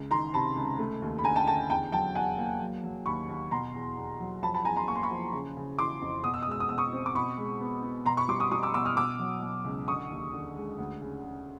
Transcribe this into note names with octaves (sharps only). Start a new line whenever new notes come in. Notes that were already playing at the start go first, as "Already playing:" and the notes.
Already playing: C#2
D#3 A#5 C6
C3 A5 B5
C#2
A3
D#2
B5
D3 G#5 A#5
G5 A5
D3 G5 A5
E2 G5 A5
F#3 G5 A5
E2 F#5 G#5
A#3
F#3
F#3
D#2 B5 C#6
D#2
B2 A#5 C6
E2
E2
F#3
F3 A5 B5
A5 B5
E2 G#5 A#5
A#5 C6
A#3 C#6
C6
B5 C#6
F3
C#3
C#3
E3 C6 D6
F2
B2 D#6
E6
D#6
G#3 E6
D#6
B2 E6
C#6 D#6
C4
D6
B2 B5 C#6
G#3
B3
B3
B2 A#5 C6
B5 C#6
G3 C6 D6
C#6 D#6
G3 C#6 D#6
D6 E6
B2 D6 E6
D#6 F6
B2 D6 E6
F#3
B2
C#2
D3 C#6 D#6
D#2
D3
G#3
D2
C#3
C#3